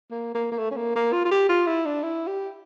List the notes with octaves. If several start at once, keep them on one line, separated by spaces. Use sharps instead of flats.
A#3
A#3
A#3
A3
C#4
A#3
A#3
F4
F4
G4
F4
E4
D4
E4
G4